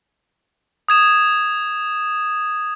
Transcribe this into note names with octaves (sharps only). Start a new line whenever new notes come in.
D#6 G#6 E7